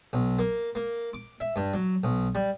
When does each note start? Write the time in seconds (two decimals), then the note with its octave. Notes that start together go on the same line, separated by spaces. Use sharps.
0.13 B1
0.39 A#3
0.75 A#3
1.13 D6
1.40 E5
1.56 G2
1.74 F#3
2.04 B1
2.35 G3